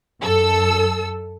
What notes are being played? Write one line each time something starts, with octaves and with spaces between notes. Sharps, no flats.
F#2 A4 E6